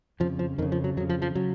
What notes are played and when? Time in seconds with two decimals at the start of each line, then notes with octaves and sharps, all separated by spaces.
0.20 F2 C#3 F3
0.39 F3
0.58 F2 D#3
0.62 C#3
0.72 F3
0.84 F#3
0.97 F2 F#3
1.00 C#3
1.09 F3
1.22 F3
1.35 C#3 F#3